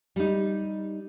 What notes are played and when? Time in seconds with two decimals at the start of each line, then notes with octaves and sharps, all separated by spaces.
0.16 G3 D#4